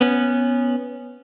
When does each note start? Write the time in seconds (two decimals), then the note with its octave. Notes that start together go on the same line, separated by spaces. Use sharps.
0.01 B3 C#4